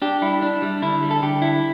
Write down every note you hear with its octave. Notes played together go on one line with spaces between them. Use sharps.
D4 G4
G3 E4
D4
G3
D3 E4
G3
A4
D3 G4
E4